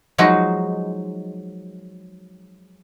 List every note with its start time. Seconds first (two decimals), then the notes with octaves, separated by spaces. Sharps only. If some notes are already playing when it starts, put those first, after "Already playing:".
0.18 F3 F#3 G#3 D#4 F#4